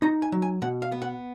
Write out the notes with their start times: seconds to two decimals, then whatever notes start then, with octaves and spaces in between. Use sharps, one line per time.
0.02 D#4 A#5
0.22 G#5
0.32 F#3
0.42 G#5
0.62 B2 F#5
0.82 F5
0.92 B3
1.02 F#5